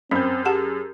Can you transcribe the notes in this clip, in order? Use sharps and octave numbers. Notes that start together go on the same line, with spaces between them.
F#2 C4 C#4 G6
G4 G#4 F#5 A5